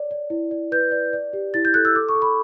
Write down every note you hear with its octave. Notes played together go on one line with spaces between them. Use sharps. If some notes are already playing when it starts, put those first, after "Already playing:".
Already playing: C#5 D5
D5
E4
D5
B4 G6
D5
D5
G4
E4 A6
G6
A4 F#6
E6
A4 D6
C#6
A4
B5